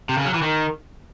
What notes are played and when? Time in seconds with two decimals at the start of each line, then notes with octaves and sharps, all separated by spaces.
0.09 C3
0.17 C#3
0.26 F#3
0.34 E3
0.42 D#3